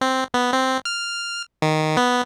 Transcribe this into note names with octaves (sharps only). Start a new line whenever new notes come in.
C4
B3
C4
F6
D#3
B3